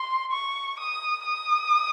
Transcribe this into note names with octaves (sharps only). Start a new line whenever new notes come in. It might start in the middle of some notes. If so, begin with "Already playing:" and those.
Already playing: C6
C#6
D#6
D#6